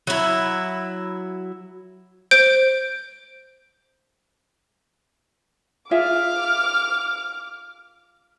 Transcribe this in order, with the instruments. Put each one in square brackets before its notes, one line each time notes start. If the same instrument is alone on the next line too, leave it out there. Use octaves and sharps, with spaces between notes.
[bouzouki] F#3 E4
[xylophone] C5 G6 D7
[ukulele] F4 G#4 E5 [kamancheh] D6 F6